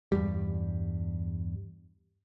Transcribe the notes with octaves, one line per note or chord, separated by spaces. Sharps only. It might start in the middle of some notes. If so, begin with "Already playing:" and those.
E2 G2 G3